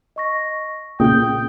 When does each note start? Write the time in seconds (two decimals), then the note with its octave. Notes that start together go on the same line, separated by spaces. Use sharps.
0.16 D#5 C#6 A#6
1.00 A#2 C#3 G5 D#6 G6